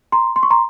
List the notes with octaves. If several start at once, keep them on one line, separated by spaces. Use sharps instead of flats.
A#5 C6
C6
C#6
A#5 C6